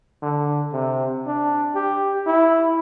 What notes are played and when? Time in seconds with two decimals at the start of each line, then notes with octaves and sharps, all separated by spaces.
0.22 D3
0.73 C3
1.26 D4
1.75 G4
2.27 E4